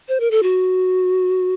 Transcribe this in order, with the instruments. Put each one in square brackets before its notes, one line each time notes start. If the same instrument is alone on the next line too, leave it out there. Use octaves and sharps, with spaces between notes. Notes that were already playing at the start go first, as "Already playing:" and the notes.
[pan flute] C5
A#4
A4
F#4